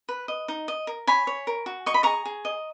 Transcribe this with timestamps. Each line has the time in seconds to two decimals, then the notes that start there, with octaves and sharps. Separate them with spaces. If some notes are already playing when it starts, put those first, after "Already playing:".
0.09 B4
0.28 D#5
0.48 D#4
0.68 D#5
0.87 A#4
1.07 C#5 G#5 B5
1.27 C#5
1.47 A#4
1.66 F#4
1.86 D#5 C#6
1.94 B5
2.03 G#4 A#5 C#6
2.25 G#4
2.45 D#5